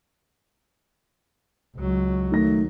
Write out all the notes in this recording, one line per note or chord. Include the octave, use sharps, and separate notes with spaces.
C#2 F#3
D#3 A3 A#6